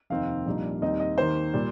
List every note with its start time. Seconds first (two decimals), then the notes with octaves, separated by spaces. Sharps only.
0.10 F1 D#2 D#3 C4 D#4 F5
0.46 A#1 A#2 G3 D#4
0.81 D#2 D#3 G3 C4 D#4 D#5
1.00 D#5
1.17 D#2 D#3 A#3 C5
1.53 A#2 G3